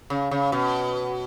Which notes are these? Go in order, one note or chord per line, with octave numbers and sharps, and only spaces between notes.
C#3
C#3
B2